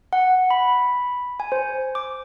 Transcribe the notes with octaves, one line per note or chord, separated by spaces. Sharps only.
F#5
B5
G#5
C5
D6